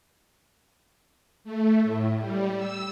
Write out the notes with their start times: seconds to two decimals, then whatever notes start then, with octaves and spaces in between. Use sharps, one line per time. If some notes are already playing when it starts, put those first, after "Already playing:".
1.44 A3
1.84 A2
2.16 G3
2.57 E6